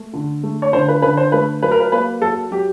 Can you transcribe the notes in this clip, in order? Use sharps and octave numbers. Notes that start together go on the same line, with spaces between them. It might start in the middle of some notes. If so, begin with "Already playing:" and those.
Already playing: A3
D3
A3
C#5
D3 C5
B4
D3 B4
C5
A3 B4
F#3 B4
A#4
B4
A#3 B4
F#3 A4
F#3 G4